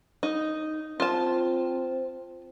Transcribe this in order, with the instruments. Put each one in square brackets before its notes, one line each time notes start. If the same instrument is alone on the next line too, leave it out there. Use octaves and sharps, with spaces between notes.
[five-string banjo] D#4
[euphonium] C4 [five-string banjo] F4 A5